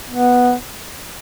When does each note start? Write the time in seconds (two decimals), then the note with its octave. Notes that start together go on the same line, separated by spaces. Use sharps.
0.10 B3